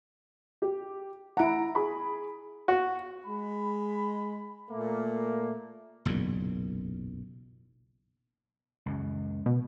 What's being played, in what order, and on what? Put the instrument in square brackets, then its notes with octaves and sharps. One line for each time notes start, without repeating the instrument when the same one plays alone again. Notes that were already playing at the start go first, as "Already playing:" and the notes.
[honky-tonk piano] G4
[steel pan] E4 F#5 [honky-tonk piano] A#5 D7
[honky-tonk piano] G#4 B5
[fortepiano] F#4
[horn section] G#3 B5
A#2 A3 A#3
[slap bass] F#1 B1 E2 A#2
C#2 F#2
[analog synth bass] B2